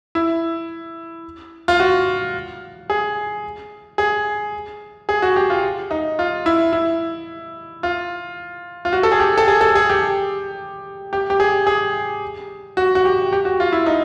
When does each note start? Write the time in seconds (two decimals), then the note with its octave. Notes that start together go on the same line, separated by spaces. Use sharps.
0.15 E4
1.68 F4
1.80 F#4
2.90 G#4
3.98 G#4
5.09 G#4
5.22 F#4
5.36 G4
5.50 F4
5.91 D#4
6.19 F4
6.46 E4
6.73 E4
7.83 F4
8.85 F4
8.93 F#4
9.03 A4
9.12 G#4
9.20 G4
9.38 A4
9.48 G#4
9.61 A4
9.75 G#4
9.89 G4
11.13 G4
11.30 G4
11.40 G#4
11.67 G#4
12.77 F#4
12.95 F#4
13.05 G4
13.32 G4
13.45 F#4
13.60 F4
13.73 E4
13.86 D#4